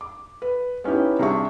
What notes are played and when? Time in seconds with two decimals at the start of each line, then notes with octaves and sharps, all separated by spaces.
0.01 D6
0.42 B4
0.84 B3 C#4 D#4 E4 G4
1.19 C3 G3 D4 G#4 E5 C#6